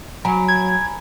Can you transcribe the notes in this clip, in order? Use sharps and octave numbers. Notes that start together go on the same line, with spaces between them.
F#3 G#5 A#5 B5
G#6